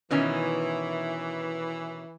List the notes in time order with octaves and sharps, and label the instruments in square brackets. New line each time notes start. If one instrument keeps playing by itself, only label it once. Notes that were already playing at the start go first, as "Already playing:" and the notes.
[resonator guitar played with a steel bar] B2 D#3 C#4 [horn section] E3